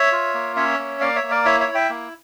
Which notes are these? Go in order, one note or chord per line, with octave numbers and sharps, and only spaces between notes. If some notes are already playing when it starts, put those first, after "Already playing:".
Already playing: C#5 E5
F4
A#3
C#4 C#5 E5
A#3
A#3 D5 F5
C#5 E5
A#3
A#4 D5
E4 C#5 E5
C#5 E5
E4
E5 G5
A#3